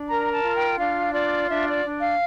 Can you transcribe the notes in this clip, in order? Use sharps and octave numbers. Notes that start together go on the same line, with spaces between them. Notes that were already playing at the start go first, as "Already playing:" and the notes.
Already playing: D4
A#4 A#5
A5
F4
G5
D4 F5
F4 D5
D4 E5
D5
D4
F5